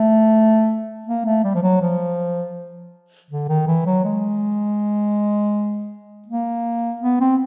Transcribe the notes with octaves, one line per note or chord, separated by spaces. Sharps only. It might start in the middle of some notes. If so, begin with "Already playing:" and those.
Already playing: A3
A#3
A3
G3
F3
F#3
F3
D3
D#3
E3
F#3
G#3
A#3
B3
C4